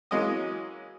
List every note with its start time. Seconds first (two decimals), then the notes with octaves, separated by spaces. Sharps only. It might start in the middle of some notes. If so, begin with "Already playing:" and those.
0.11 E3 F#3 G#3 A#3 C#4 D#5